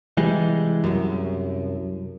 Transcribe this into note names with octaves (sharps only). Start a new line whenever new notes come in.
C2 E3 G3 G#3
C2 F#2